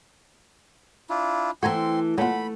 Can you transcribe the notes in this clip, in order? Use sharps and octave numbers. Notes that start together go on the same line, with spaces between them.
D4 E4 F4
E3 A3 C4 F#4 G#5 A#5 C6
A#2 F#3 A3 F#5 B5